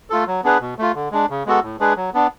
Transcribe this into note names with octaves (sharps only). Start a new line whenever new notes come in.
A3 F4 A4
F#3
B3 D4 G#4 B4
B2
A3 F4
D3
G#3 D4
C#3
G#3 B3 F#4 A4
A2
G#3 D4 G#4 B4
F#3
B3 D4